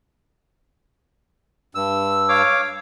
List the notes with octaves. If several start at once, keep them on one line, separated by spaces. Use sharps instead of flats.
G2 E6
C#5 F5 D6